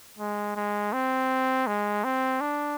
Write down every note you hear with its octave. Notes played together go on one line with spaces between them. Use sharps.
G#3
G#3
C4
G#3
C4
D4